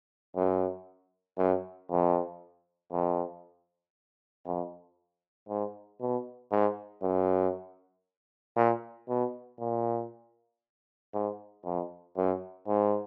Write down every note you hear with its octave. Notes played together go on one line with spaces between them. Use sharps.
F#2
F#2
F2
F2
F2
G#2
B2
G#2
F#2
A#2
B2
A#2
G#2
F2
F#2
G#2